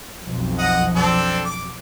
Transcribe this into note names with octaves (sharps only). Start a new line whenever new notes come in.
B1 F2
D#5 F#5
C4 D4 A4
D6